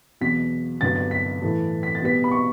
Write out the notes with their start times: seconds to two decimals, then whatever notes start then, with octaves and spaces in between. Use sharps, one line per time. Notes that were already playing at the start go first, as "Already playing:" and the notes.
0.21 E2 B2 F#3 B6
0.81 G2 D3 F#3 B3 A6
0.96 A6
1.11 B6
1.41 A2 E3 A3
1.83 B6
1.95 A6
2.01 B2 G3 B3 B6
2.24 B5
2.31 C#6